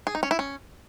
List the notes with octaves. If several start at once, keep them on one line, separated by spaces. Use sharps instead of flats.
G#4
D#4
C#4
E4
C#4